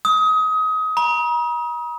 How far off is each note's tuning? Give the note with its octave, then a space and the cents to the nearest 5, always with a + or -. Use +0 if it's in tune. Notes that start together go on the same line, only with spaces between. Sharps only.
D#6 +25
A#5 +45